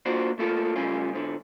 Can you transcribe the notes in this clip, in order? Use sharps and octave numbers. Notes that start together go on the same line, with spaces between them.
A#3 D4 F4 F#4 C5
A3 A#3 F4 A4
C#3 G3 A3 C#4 F4
G#2 D3